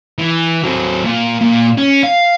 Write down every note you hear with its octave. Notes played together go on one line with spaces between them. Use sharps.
E3
F#3 C4
A#2
A#2
C#4
F5